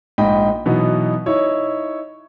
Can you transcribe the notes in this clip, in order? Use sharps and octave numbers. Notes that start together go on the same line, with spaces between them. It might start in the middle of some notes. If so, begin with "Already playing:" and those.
A#1 G#2 D#5 G5 B5
B2 E3 F#3 B3 D#4
D#4 E4 C#5